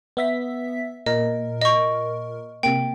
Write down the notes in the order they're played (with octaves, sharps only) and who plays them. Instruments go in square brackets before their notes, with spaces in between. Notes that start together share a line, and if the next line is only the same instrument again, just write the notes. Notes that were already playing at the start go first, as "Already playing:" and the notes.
[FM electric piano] B3 E5 B6
[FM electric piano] A#2 A#4 [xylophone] D#5
[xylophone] D#5 C#6
[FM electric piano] C3 A#3 [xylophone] G5